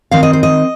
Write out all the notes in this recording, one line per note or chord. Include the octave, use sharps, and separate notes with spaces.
D#3 C4 D#4 F5
D#5
C5
D#5